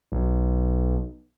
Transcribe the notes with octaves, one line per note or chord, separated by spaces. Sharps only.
B1